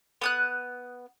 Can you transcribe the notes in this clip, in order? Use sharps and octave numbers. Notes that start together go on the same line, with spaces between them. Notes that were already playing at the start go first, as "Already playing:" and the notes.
B3 D#6 F#6